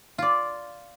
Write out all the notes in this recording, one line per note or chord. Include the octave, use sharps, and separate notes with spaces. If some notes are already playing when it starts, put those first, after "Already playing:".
F4 D5